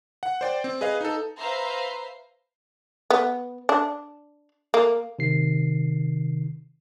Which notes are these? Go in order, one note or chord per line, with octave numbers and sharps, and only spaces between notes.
F#5
C5 D5 G5
C4
G#4 B4 D#5 F5
D#4 A4
B4 C5 E5 F5 A#5 C6
B3
D4
A#3
C3 D#3 C7